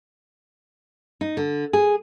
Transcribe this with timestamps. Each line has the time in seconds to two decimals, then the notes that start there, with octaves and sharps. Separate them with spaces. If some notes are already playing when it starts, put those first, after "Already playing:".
1.21 D#4
1.37 D3
1.73 G#4